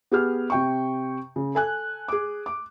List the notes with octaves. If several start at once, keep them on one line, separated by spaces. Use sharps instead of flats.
B3 G4 G#4 F6
C3 G5 C#6
C#3
A4 G#5 F#6
G#4 D6
D6